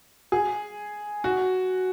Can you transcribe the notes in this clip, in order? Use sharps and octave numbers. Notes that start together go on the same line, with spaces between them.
G#4
F#4